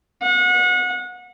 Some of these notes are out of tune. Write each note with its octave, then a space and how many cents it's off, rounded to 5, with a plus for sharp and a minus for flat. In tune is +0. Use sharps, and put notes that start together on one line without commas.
F#5 -30